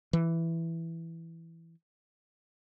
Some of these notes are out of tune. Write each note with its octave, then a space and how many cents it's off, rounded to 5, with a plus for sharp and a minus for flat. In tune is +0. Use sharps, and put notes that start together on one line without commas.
E3 +5